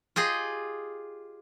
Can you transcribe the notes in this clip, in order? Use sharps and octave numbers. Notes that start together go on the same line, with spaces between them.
F4 G4 G#4 D#5